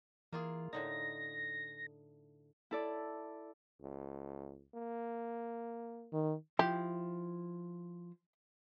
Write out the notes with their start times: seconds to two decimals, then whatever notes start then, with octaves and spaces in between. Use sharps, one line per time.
0.33 E3 A#3 F4 G#4
0.73 A2 D3 D#4 A#6
2.71 E4 A4 D5
3.82 C#2
4.74 A#3
6.13 D#3
6.59 F3 E4 G4